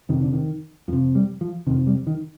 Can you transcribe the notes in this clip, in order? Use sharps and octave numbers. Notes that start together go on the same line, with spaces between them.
F2 C3 D#3
D3
D#3
F2 C3 F3
G3
F3
F2 C3 D#3
G3
D#3